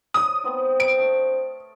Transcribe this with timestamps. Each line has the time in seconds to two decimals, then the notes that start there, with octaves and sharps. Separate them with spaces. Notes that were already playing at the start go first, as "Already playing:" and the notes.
0.14 C#5 D5 D#6
0.44 B3 C4 D#4
0.80 C5 D#5 D7
0.98 A3 D4 A5
1.27 C#6